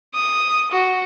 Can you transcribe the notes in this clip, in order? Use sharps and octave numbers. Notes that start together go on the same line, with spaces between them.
D#6
F#4